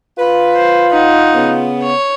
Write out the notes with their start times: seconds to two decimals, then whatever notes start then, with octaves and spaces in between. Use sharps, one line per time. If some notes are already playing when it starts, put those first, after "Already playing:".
0.19 F4 B4
0.56 C5
0.91 D#4 F#5
1.34 C#3 B3
1.83 C#5